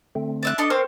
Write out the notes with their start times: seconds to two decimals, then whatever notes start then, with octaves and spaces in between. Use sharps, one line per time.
0.15 D3 A3 C4
0.43 D5 E5 F#6
0.58 D4 A4 D#5
0.70 C4 A#4 C5 C#5